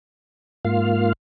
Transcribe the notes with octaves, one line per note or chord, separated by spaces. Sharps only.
G#2 A#3 F4 F5 F6